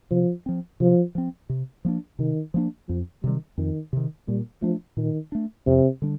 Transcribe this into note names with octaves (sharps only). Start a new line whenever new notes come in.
C3 F3
F3 C4
C3 F3
F3 C4
C3
F3 A#3 D4
C3 D#3
F3 A#3 D4
F2 F3
C3 D#3 G3
F2 D#3
C3 D#3
A#2 G3
F3 A3 D4
A#2 D#3
A3 D4
F2 C3
D3 G3 D4